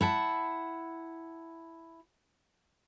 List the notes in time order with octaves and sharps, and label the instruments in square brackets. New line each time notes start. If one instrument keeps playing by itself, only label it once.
[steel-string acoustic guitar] E4 F#5 A5